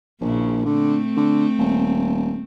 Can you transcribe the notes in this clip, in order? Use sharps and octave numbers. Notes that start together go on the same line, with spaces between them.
A#1 A#2 C#3 E4
D3 A3 C4
D3
D#1